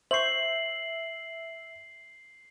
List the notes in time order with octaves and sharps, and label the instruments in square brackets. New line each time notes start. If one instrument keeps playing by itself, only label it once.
[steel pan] C5 C#6 [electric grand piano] E5 [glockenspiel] C7 F#7